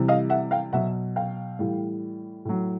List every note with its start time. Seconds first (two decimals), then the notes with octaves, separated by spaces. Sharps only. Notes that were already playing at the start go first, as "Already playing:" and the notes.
Already playing: C3 E3 G3
0.08 D#5 F5
0.30 E5 F#5
0.51 F5 G5
0.73 B2 F#3 E5 F#5
1.16 F5 G5
1.59 A2 E3 G3
2.45 A2 F#3